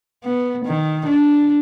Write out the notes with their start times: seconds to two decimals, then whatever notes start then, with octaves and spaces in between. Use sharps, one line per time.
0.24 B3
0.65 D#3
1.07 D4